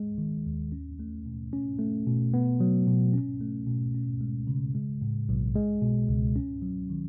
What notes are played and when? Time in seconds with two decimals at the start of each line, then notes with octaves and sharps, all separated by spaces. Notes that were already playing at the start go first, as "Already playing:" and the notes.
Already playing: G#3
0.18 D#3
0.46 D#2
0.72 C#4
1.00 A3
1.26 B2
1.53 C#4
1.79 A3
2.06 B2
2.34 B3
2.60 F#3
2.87 B2
3.13 C#4
3.41 A3
3.67 B2
3.95 C#4
4.21 G#3
4.47 C#3
4.75 G#3
5.01 A2
5.29 B1
5.56 G#3
5.82 B2
6.09 C#2
6.36 C#4
6.62 F#3
6.90 D#3